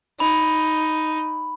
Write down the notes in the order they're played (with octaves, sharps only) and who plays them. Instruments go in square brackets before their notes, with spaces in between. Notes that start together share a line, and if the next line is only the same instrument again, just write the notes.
[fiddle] D#4 [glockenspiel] B5